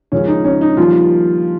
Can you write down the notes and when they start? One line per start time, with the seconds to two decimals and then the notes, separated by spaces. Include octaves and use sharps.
0.12 D#2 C#3 F3 G#3 C#4
0.28 D#4
0.44 C#4
0.61 D#4
0.77 D#3 F3 G3 A#3 F4